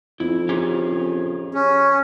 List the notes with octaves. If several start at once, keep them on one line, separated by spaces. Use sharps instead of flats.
F2 E4
C#4 G4 G#4
C#4